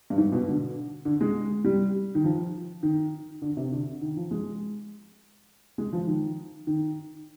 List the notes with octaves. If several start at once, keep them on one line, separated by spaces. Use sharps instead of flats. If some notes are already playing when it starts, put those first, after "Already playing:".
G2
G#2
B2
D3
D3
G#3
G3
D#3
F3
D#3
D3
C3
D3
D#3
F3
G#3
G#3
F3
D#3
D#3